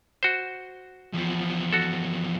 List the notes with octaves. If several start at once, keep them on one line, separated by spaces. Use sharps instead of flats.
F#4 C5
E2 F3
F#4 A4